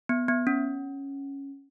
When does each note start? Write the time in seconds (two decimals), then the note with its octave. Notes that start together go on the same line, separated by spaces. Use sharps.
0.09 B3
0.28 B3
0.47 C#4